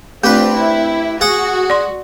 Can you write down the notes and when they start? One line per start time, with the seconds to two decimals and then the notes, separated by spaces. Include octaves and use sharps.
0.24 A3 C4 D4 F4 G4 B4
0.56 E4
1.21 F#4 G#4 F#5
1.70 D5 C6